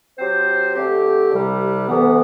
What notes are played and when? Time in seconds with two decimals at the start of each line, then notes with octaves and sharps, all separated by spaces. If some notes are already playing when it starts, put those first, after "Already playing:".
0.18 F#3 C4 G4 C5
0.75 D3 A3 C4 G4
1.31 C2 C3 G3
1.88 D2 C3 E3 B3